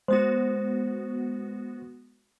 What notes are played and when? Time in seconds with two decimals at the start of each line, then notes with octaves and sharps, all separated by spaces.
0.08 G#3 B3 F#4 C5